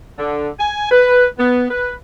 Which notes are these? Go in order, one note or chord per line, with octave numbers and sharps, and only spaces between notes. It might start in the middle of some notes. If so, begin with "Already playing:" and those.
D3
G#5
B4
B3
B4